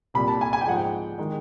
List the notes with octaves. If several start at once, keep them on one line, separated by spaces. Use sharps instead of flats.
C2 A#2 G3 B5
A5
G#5
G#5
G5
G#2 F3 G#3 F#5
G5
D#3 G#3